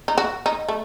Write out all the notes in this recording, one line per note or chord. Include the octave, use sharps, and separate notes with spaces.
D#4
F#4
D#4
A3